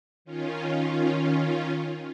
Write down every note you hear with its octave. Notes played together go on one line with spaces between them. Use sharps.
D#3 C#4 F4